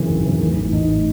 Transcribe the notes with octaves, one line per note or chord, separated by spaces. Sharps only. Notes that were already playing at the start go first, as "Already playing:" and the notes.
Already playing: F#2 C#3 E3 C4
G#1
F#2 C#3 E3
A1
A2 E3
A1 D#4
A2 E3